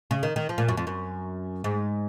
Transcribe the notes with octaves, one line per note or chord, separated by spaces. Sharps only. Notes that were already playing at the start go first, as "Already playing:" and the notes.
C#3
D#3
D#3
F3
A#2
F#2
F2
F#2
G#2